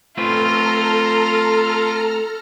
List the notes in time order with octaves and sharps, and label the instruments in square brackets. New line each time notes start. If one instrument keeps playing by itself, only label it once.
[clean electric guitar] A3 C4 B4 [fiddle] F4 [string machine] A4 A#5 F6